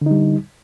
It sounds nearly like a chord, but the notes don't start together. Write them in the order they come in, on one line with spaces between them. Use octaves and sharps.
D3 D#4 G3